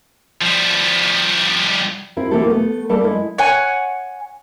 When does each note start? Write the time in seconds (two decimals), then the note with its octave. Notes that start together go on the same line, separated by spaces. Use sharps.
0.41 F3 G3
2.17 C4 E4 A#4
2.31 C3 E3 A#3 E4 G4 A4
2.48 A3 B3
2.89 G3 A#3 A4 A#4 D5 A5
3.04 G#3 E4
3.38 C#5 F#5 G#5